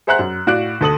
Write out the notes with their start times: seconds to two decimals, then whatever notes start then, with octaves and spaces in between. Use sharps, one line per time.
0.07 G#4 C5 E5 F#5 A#5 F#6
0.19 F#2
0.47 A2 F#4 D5 F5 F#6 D7
0.81 D2 A4 D#6 F#7